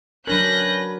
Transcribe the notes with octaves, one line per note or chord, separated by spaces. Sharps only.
F#3 C#4 D4 A#4 B4 F#6 G6 A#6